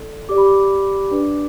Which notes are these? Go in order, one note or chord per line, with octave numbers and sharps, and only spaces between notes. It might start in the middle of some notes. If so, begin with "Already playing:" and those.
Already playing: E4 A4 D5
G4 D5 D6
B5
D6
D4 B4 D5